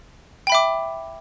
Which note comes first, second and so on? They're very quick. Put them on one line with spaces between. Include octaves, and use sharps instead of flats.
G5 B5 E5 D6